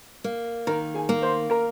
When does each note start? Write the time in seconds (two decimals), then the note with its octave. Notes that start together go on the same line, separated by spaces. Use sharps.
0.24 A#3
0.67 D#3 A#4 A#5
0.94 G#4 G#5
1.09 A#3
1.22 C5 C6
1.50 A#4 A#5